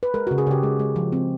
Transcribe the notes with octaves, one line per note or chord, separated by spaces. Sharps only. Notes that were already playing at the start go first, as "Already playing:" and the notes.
B4
G#3 A#4
F#4
C#3
G#4
C#3 G4
G#3
G#3
F3
C4